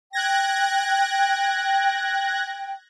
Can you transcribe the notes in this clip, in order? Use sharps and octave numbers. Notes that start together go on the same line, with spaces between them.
G5 F#6 G#6 A#6